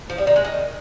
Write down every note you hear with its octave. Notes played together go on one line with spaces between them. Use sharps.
F3
G3
D#3
G#3
D#3